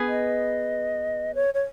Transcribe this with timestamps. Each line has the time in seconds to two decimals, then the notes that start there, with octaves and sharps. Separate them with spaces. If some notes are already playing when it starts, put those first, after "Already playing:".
Already playing: B3 G#4 B4
0.08 D#5
1.35 C#5
1.54 C#5